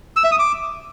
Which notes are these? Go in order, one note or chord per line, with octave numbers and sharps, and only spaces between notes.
E6
E5
D#6
D6